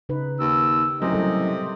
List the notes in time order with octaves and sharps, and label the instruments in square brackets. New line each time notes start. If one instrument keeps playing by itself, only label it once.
[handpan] C#3 D#4 B4
[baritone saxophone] D#2 [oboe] E6
[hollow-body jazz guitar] F#2 A2 [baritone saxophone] C3 [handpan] A#4 [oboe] D#5
[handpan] G3 A4 A#4